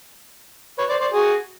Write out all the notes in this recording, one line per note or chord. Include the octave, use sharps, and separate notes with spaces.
B4 C#5
C5 D5
C5 D5
F#4 G#4